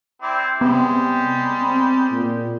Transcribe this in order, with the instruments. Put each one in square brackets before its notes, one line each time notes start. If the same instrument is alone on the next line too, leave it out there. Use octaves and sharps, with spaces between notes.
[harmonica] C4 E4 D5
[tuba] C3 [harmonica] G3 G#3 G4 [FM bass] B3
[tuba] C4
A#2